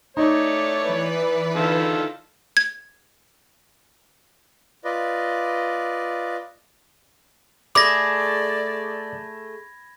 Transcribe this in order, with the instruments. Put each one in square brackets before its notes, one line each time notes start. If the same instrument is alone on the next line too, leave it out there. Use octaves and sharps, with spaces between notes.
[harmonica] A3 C#5 [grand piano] D#4 [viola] D5
[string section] E3 B4
[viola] D3 E5 [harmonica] D#3 F4 A4
[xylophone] G#6
[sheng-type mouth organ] F4 B4 D5 D#5
[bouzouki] A3 G#4 [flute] D5 [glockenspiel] B5 G#6 A#6 [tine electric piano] D6